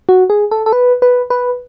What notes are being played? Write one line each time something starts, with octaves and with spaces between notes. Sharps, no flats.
F#4
G#4
A4
A4
B4
B4
B4